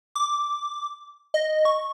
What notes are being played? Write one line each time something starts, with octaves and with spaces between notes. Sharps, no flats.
D6
D#5
C#6